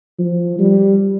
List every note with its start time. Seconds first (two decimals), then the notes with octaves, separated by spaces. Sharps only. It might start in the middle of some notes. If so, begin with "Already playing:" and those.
0.19 F3
0.59 G3